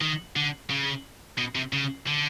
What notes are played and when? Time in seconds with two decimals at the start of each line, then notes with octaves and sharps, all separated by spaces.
0.02 D#3
0.36 D3
0.70 C#3
1.38 B2
1.55 C3
1.73 C#3
2.07 D3